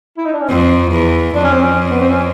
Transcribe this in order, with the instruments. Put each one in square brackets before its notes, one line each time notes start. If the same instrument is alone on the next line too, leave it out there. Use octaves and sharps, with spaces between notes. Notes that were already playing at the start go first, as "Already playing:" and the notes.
[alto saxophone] E4
D#4
D4
C#4
[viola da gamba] F2 [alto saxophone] C4
[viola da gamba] E2
[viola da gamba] F2 [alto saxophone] D4
[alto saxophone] C#4
C4
C#4
B3
C4
C#4